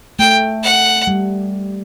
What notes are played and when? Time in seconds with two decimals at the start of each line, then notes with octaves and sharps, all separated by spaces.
0.19 A3 G5
0.63 F#5
1.07 G3